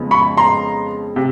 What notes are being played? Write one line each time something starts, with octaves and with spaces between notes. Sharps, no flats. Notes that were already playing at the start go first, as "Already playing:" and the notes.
Already playing: F2 C#3 F3 G#3 B3
B5 C#6
A#5 C6
C3